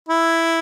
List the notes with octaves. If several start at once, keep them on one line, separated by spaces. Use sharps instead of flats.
E4